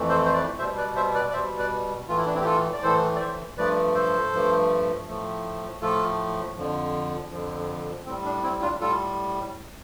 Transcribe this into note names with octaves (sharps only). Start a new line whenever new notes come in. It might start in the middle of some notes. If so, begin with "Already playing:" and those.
Already playing: F2 E3 A3
A4 C5
C5
B4 D5
B2 G3 C5 E5
B4 D5
C5 E5
B4 D5
D5
B2 G3 C5 E5
B4 D5
A2 E3 A3 F4
E4
D4
C4 E4
G4
F4 A4
D5
A2 E3 A3 A4 C5
D5
C5 E5
G2 F3 A3 B4 D5
A4 C5
G2 F3 A3
A2 F3 A3
A2 F3 A3 F4 A4
F2 D3 F3
F2 D3 F3
A2 G3 C4
D4
C4 E4
D4 F4
A2 G3 F4 A4